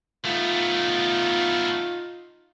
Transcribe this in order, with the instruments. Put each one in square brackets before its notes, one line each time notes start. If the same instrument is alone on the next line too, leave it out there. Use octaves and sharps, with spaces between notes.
[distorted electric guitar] A3 B3 [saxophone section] D#4 F4